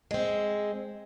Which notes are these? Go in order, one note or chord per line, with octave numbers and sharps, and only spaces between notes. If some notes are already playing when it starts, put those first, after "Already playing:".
G#3 C4